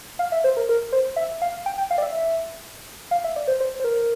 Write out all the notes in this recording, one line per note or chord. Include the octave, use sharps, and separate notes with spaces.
F5
E5
C5
A#4
A#4
C5
E5
F5
G5
G5
F5
D5
E5
F5
E5
D5
C5
C5
C5
A#4